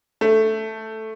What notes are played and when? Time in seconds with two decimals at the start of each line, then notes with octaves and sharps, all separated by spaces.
0.21 A3